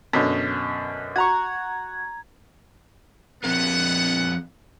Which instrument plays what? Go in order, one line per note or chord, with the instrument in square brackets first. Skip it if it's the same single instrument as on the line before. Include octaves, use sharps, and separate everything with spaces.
[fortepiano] F#2 B2 D3
[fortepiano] F#4 C#6 [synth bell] A#5 G#6
[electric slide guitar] F3 C4 A#4 [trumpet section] B3 F#5